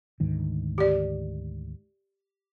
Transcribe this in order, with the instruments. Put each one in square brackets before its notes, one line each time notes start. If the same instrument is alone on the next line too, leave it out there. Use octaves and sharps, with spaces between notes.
[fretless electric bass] D2 G#2 D#3
[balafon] G4 D5